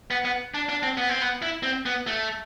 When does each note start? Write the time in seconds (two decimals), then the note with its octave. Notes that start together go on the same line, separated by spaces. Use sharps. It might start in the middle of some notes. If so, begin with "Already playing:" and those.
0.11 B3
0.25 B3
0.54 D4
0.69 D4
0.83 C4
0.97 B3
1.09 C4
1.21 B3
1.42 E4
1.63 C4
1.86 B3
2.07 A3